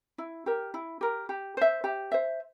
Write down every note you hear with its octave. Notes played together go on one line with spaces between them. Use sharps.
E4
G4 A#4
E4
G4 A#4
G4
C5 E5
G4
C5 E5